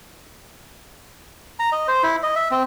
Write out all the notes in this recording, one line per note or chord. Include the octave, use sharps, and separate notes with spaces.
A#5
D#5
C5
E4
D#5
E5
C4